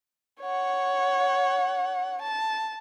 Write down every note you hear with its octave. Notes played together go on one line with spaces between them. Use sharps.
C#5 F#5
A5